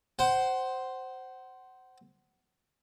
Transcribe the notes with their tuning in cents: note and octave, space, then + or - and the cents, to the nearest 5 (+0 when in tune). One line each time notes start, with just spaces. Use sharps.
C5 +0 F#5 +25